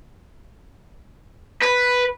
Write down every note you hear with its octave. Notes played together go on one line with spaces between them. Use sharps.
B4